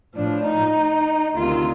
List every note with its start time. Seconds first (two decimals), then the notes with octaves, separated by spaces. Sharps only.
0.15 A2 F3 D4
0.45 D#4
1.35 D2 C3 D#3 F4